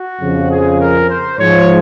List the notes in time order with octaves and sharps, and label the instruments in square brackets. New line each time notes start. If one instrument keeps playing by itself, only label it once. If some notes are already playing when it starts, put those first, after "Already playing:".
Already playing: [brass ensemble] F#4
F2 C#3 F3
G#4
A#4
C5
G#2 F3 C#5